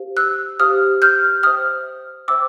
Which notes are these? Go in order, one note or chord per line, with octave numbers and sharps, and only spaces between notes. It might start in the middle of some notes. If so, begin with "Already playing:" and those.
Already playing: G4 C5 F5
E6 F#6
G4 C5 F5 D#6 F6
F6 G6
C5 E5 G5 D#6 F6
C5 E5 G5 D6 E6